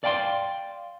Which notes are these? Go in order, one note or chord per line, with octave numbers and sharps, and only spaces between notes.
D5 F5 G5 B5 C6